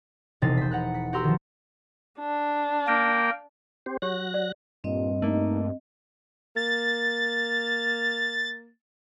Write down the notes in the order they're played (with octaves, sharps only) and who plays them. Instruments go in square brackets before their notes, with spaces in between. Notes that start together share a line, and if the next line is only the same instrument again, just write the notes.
[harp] E1 A#1 C3 D#4 A6 C7
C5 B6
B4 F#5 A#5 F#6
B6 C#7
F#4 G4 F#5 A#5 C6 E6
D#3 F3
[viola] D4
[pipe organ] A#3 A#4 G5
[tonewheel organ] C4 G4 C5
[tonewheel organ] F#3 F#6 A#6 [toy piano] G4 C#5
[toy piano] D5
[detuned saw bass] G2 [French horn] A#2 [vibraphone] C4 D#5
[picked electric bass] A3 A#3 [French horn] D#4
[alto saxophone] A#3 [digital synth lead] A6